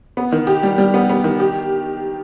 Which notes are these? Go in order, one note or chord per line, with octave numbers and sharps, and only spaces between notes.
B3
D#3
G4
G3
G3
B3
B3
D#3
G4